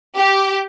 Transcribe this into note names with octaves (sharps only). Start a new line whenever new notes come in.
G4